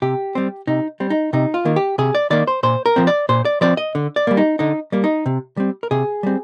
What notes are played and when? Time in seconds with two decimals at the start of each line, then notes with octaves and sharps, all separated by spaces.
0.02 C3 G4
0.35 G3 C4
0.67 C3 D#4
1.00 G3 C4
1.10 D#4
1.33 C3 D#4
1.54 F4
1.65 D#3 A#3
1.76 G4
1.98 C3 G#4
2.15 D5
2.30 D#3 A#3 D5
2.47 C5
2.63 A#2 C5
2.86 A#4
2.96 F3 C4
3.07 D5
3.29 A#2 C5
3.45 D5
3.61 F3 C4 D5
3.77 D#5
3.95 D3
4.16 D5
4.27 G3 A#3
4.37 D#4
4.59 D3 D#4
4.92 G3 A#3
5.04 D#4
5.26 C3
5.57 G3 C4
5.83 A#4
5.91 C3 G#4
6.23 G3 C4